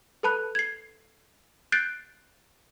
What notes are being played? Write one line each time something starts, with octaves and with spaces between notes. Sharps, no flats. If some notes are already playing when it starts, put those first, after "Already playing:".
A4 B4 A5 B5 F#6
G#6 C7
F#6 G6 A6 C7 D7